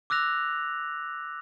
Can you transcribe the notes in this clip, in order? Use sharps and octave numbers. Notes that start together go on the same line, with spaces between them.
D6 E6 F#6 A#6 F7